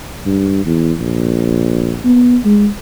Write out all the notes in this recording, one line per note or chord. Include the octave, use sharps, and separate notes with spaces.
G2
E2
A#1
B3
G#3